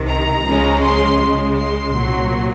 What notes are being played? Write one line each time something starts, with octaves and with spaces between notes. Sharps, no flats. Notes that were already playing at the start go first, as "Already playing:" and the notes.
Already playing: C2 C3 D#3
A#5
C#2 C#3 F3 G#3 C#4
C6
C#2 C#3 G#3
C6
C2 A#2 F#3